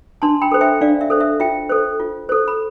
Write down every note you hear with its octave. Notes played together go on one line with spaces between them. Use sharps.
D4 A5 C6
G5 B5
A4 C5
E5 G5
D4 D5 F5
E5
A4 C5
E5
F4 E5 G5
A4 C5
F4
A4 C5
B5